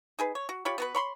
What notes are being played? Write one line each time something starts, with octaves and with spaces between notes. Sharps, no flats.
D#4 G#4 B4
C#5
F#4
F4 G4 C#5 B5
B3 F#4 B4
C#5 B5 C6